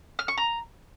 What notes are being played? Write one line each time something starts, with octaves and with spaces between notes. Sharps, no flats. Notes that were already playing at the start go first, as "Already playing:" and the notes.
F6
C#6
A#5